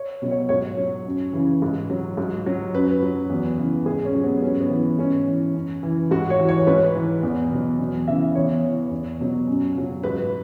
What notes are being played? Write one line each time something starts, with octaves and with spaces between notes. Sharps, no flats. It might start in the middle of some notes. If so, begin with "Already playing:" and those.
Already playing: C#5
B2 F#3
C#5
G#2 C#5
F#3
F#2
C#3 E3
G#2
F#3
G#2
F#3
F#2 B4
F#3
E2
C#3 E3
G#2 G#4
C#4
F#3
B3
G#2 C#4
B3
E3
G#2 C#4
E3
F#2
E3
G#2 F#4
C#5
E3
C#5
G#2 B4
E3
E2
B2 F#3
E2
C#3 E3 E5
E2 C#5
E3
E2
B2 F#3
F#2
C#3 F#3
G#2 B4